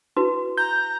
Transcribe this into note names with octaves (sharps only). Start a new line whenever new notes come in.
E4 F#4 B4
A#5 G6